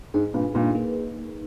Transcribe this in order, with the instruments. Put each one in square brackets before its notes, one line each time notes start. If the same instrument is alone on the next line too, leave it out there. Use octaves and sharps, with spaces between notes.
[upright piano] G#2 [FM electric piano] G#4
[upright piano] G2 A#2 [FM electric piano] B4
[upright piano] G2 A#2 [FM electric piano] D#4
[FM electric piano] A#3